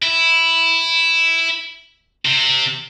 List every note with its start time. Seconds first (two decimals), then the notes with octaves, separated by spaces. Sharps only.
0.03 E4
2.25 C3